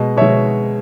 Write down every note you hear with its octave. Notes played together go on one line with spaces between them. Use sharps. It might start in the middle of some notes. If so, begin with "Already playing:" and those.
Already playing: B2 G#3 D#5
B2 G#3 C#5 E5